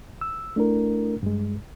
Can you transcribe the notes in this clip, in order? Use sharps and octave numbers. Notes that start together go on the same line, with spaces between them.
E6
A3 D4 E4 A#4
G2 G#3